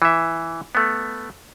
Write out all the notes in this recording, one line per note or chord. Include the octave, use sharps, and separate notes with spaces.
E3 E5
A3 B3